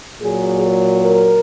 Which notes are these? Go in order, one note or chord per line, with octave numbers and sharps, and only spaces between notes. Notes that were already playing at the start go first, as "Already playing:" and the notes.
A#2 F#3 G#4
A#4
A#4